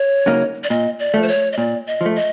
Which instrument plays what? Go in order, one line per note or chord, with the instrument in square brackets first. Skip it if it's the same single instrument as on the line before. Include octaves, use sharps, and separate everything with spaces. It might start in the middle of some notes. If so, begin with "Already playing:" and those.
Already playing: [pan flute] C#5
[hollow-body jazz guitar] C#3 F#3 A#3 D#4
[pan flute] D5
[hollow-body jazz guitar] A#2 [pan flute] D#5
[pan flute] D5
[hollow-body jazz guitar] F3 A3
[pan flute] C5
C#5
D#5
[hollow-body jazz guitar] A#2 [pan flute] D5
[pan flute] D#5
[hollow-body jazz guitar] F3 A3
[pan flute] D#5